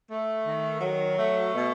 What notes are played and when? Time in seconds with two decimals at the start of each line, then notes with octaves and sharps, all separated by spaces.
0.10 A3
0.45 D#3
0.81 F#3
1.17 A3
1.53 B2